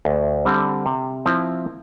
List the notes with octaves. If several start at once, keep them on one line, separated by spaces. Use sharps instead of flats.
D2
D3 G3 C4
C3
F3 C4 E4